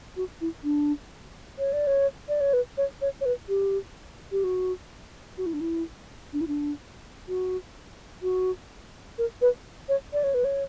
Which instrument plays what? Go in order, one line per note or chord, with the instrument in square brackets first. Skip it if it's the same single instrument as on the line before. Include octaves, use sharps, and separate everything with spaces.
[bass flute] F#4
E4
D4
C#5
D5
C#5
D5
C#5
B4
C#5
C#5
C#5
B4
G4
G4
F#4
F#4
E4
D4
E4
D4
E4
D4
F#4
F#4
A#4
B4
C#5
D5
C#5
B4
C#5